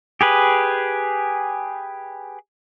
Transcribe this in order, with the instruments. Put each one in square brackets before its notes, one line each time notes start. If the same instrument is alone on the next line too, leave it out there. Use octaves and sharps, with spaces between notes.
[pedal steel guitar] G4 G#4 B4